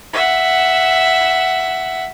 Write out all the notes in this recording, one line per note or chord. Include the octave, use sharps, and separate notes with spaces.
E5 F#5